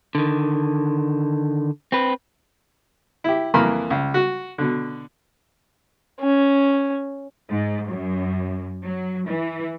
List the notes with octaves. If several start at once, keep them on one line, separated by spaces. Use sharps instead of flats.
D3 D#3
C4 B4
E4 G4
F2 E3 A#3 A#4 B5 C6
C#2
F#4
B2 D3
C#4
G#2
F#2
F#3
E3